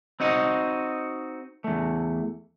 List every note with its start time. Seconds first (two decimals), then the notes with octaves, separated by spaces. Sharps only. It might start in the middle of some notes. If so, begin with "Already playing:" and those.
0.20 C4 D#4 F#4 D#5
1.64 E2 A3